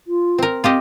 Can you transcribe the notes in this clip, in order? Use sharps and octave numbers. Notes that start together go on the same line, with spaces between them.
F4
C4 A#4
C4 F4 G4 D#5